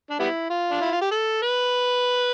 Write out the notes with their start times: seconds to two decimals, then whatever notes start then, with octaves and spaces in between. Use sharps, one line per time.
0.10 D4
0.19 G3 B3 E4
0.50 F4
0.71 D4
0.81 E4
0.92 F4
1.02 G4
1.12 A4
1.43 B4